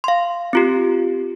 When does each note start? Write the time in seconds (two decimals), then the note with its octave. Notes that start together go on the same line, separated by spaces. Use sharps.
0.04 F5 C6
0.53 C4 F4 G4